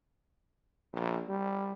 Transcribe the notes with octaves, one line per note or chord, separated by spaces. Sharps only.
A#1
G3